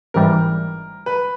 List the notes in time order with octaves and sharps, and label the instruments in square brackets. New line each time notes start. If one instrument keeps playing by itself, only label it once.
[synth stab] A1 G#2 E3 G3 [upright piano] A#4
[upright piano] B4